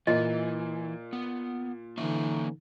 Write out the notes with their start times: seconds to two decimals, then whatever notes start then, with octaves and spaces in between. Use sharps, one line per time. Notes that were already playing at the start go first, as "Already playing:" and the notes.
0.07 A#2 E3 D#5
1.13 B3
1.98 D3 E3 A#3 C#4 D#4 E5